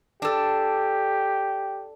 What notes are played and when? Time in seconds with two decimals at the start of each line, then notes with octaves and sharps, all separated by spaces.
0.22 D4 G4 A4